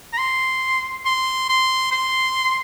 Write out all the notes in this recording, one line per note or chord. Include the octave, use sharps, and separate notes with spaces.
A#5
C6
C6
C6
C6